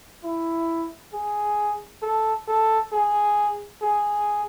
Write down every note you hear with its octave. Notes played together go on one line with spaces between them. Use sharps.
E4
G#4
A4
A4
G#4
G#4